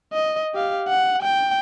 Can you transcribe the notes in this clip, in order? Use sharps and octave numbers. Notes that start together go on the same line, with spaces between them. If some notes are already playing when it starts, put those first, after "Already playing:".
D#5
G4 F5
F#5
G5